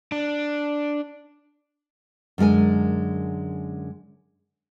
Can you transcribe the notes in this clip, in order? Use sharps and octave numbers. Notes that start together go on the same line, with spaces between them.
D4
F#2 D3 G#3 A#4 G#5